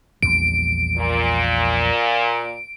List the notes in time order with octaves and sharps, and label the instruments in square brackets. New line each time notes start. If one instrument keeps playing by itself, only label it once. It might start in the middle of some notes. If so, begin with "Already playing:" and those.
[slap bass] A#1 E2 G3 [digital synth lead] D7
[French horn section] A#2